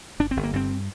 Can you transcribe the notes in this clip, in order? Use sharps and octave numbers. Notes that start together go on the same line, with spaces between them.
G1 D4
C4
G1
A#3
G2 C4